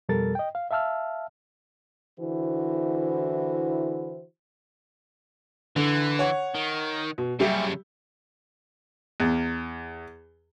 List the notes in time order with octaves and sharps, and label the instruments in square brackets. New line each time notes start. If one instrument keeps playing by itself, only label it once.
[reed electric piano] F2 B2 G3 A4 A#4 A6
D#5 G5
F5
E5 F5 A5 E6 F6
[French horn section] D3 E3 E4 F#4 C5
[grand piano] D3 [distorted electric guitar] E3
[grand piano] C#5 F#5
[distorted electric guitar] D#3
[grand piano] B2
[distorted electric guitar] F#2 C#3 [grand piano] G3 G4 E5
[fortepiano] E2